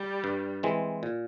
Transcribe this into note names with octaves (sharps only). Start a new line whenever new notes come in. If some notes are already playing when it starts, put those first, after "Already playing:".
Already playing: G3
G2
E3 G#3 C4
A#2